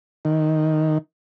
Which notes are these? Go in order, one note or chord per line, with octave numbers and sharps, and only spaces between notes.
D#3